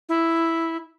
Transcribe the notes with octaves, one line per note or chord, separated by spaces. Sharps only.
E4